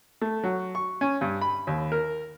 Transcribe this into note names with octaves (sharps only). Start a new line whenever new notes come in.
A3
F#3
C#6
C#4
G2
B5
D#2
A#4